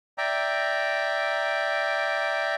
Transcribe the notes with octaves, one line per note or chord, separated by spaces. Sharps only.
D5 E5 G5 A#5